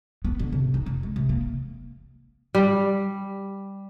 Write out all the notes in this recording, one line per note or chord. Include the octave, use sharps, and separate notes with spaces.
B3
D3
C3
D#4
F1
G#3
C3
A#3
G3